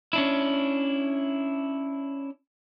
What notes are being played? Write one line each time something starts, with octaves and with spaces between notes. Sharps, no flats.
C#4 D4 E4